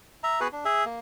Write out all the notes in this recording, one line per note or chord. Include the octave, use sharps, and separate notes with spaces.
E5 A#5
B3 F#4 G#4 B4
D4
G#4 E5
A#3